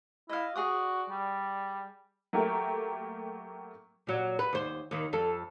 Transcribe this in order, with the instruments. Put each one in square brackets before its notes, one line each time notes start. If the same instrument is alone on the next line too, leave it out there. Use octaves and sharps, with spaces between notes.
[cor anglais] E4 [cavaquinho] D#5 F5
[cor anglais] F#4 [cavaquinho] G#4 D5 D#6
[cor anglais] G3
[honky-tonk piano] F#3 A3 A#3 G4 A#4
[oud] A#2 F#3
B4
D#2 C5
D#2 D#3
F2 A4